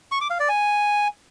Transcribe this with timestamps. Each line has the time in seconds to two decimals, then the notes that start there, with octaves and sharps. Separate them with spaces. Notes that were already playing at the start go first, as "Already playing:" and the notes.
0.12 C#6
0.21 D6
0.30 F5
0.40 D5
0.49 G#5